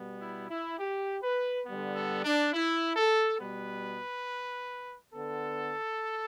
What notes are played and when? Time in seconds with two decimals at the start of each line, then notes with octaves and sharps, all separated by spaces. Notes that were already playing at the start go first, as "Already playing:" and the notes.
Already playing: B2 G3 B3
0.21 E4
0.50 E4
0.79 G4
1.23 B4
1.66 D3 G3 B3
1.95 A4
2.24 D4
2.53 E4
2.96 A4
3.40 B2 G3 B3 B4
5.13 D3 B3 A4